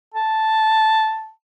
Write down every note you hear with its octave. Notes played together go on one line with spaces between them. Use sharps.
A5